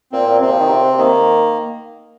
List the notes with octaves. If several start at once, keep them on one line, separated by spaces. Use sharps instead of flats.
A#2 C4
A#2
C3 C4
F3
D#3
C3
C3
D#3 A#3